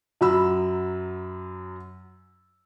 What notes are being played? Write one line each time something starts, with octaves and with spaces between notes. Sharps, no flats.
F#2 F#3 B5 E6